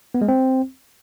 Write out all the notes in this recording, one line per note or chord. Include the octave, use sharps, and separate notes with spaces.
B3
G#3
C4